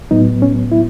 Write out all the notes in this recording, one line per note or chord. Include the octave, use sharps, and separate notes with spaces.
A2 F#3 B3 D#4
C#4
E4